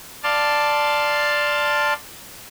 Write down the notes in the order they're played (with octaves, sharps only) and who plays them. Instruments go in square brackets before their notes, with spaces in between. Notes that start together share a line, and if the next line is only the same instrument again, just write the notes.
[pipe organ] D5 F5 A5 C6